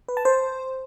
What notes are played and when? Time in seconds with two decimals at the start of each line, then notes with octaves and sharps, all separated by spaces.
0.08 B4
0.17 A5
0.25 C5